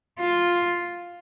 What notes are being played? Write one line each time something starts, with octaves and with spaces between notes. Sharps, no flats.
F4